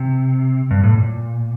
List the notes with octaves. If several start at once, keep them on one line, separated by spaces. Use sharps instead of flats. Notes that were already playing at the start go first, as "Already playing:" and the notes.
Already playing: C3
G2
A2
A#2